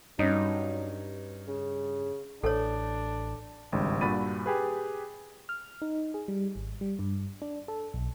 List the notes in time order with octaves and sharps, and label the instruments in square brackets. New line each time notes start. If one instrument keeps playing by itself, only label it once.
[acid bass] G2 [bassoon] F#3 [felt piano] C#4 [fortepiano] D#4
[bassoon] C#3
[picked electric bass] A1 [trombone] D4 [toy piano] A4 C#5
[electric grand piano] G#1 C#2 G2
G2 A#2 F#4 B5 A6 D#7
G4 G#4 B4
[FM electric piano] F6
D#4
G#4
G3
G#1
G3
G2
D4
A4
B1